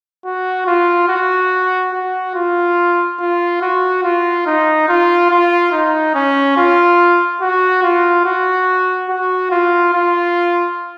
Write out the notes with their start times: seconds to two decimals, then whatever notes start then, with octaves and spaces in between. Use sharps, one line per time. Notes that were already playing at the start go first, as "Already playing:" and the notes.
0.25 F#4
0.67 F4
1.08 F#4
1.93 F#4
2.35 F4
3.20 F4
3.61 F#4
4.04 F4
4.46 D#4
4.88 F4
5.30 F4
5.72 D#4
6.15 C#4
6.57 F4
7.41 F#4
7.83 F4
8.25 F#4
9.09 F#4
9.51 F4
9.94 F4